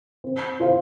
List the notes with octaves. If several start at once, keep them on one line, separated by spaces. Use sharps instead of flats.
C4
F4 C5 F5